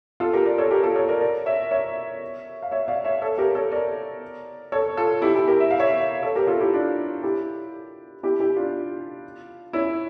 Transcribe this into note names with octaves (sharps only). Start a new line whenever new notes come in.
F4 A4
G4 A#4
A#4 D5
A4 C#5
G4 A#4
F4 A4
A4 C#5
A#4 D5
A#4 D5
C#5 E5
C#5 E5
F5
C#5 E5
D5 F5
C#5 E5
A4 C#5
G4 A#4
A4 C#5
A#4 D5
A4 C#5
F4 A4
E4 G4
E4 G4
G4 A#4
E5
F5
C#5 E5
A4 C#5
G4 A#4
F4 A4
E4 G4
D4 F4
E4 G4
E4 G4
E4 G4
D4 F4
C#4 E4